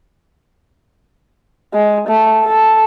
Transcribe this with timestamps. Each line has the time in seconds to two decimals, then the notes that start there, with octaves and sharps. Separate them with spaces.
1.73 G#3
2.07 A3
2.43 A4